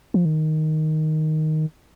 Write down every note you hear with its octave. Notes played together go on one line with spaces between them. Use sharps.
F3
D#3